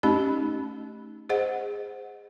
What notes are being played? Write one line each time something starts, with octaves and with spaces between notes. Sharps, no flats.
A3 C#4 D#4 G4 D#5 B5
G#4 C5 D#5 F#5